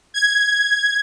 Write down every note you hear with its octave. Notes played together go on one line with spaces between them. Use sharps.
G#6